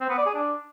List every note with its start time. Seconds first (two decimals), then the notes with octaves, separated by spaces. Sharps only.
0.01 C4
0.09 B3
0.18 D5
0.26 G#4
0.35 D4